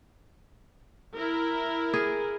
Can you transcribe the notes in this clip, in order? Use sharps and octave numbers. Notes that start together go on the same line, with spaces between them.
E4 A#4
G#4